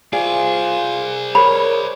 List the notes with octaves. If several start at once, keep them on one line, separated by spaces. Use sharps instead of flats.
F4 G#4 C5 D5
G#4 A#4 C#5 B5